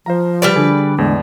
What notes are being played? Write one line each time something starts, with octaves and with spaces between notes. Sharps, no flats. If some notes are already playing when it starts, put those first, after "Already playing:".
F3 C5 F5 A#5
G3 B4 D5
D3 G#4 A4 G#5
E2 A2 G#3 D5